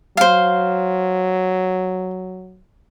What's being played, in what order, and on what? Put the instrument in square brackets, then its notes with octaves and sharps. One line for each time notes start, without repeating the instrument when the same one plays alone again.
[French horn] F#3 [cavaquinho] C5 F5